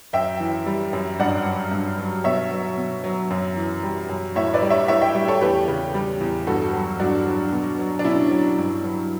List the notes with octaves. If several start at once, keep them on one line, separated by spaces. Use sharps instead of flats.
F#2 E5 G5
E3
G3
F#2
G2 D5 F#5
F#3
G2
F#3
B2 C#5 E5
F#3
B2
F#3
F#2
E3
G3
F#2
A2 C#5 E5
B4 D5
G3
C#5 E5
A2 C#5 E5
E5 G5
G3
A4 C#5
E2 G4 B4
C#3
G3
E2
G2 F#4 A4
F#3
G2 D4 F#4
F#3
B2
F#3
D4
B2 C#4 E4
F#3
G2
F#3